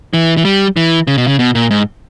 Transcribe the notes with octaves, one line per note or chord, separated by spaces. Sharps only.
E3
E3
G3
E3
C#3
B2
C#3
B2
A#2
G#2